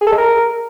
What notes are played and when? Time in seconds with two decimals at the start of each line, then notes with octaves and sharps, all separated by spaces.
0.01 G#4
0.07 A4
0.12 G#3
0.18 A#4